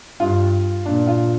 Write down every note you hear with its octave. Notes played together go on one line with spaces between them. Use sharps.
G2 F4
A#2 D4
F4